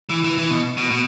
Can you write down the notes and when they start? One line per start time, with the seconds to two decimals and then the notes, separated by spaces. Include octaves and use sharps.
0.09 E3
0.24 E3
0.38 E3
0.51 B2
0.78 B2
0.92 B2